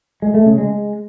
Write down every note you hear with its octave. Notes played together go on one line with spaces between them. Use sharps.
G#3
A3
C#3
G#3